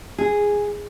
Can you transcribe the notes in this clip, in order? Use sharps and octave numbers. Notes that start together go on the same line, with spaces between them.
G#4